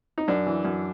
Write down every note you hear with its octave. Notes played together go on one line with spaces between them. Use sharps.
D#4
F#2 D4
E3
F#2